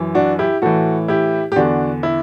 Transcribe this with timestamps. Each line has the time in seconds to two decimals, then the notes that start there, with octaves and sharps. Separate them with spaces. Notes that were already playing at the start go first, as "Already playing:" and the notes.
Already playing: F#2 E3
0.15 D4 F#4
0.39 E4 G4
0.62 A2 E3 F#4 A4
1.08 E4 G4
1.52 G4
1.56 E2 D3 D4 F#4
2.03 E4